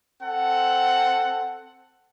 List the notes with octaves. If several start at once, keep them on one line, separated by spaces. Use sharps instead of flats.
C4 A4 F#5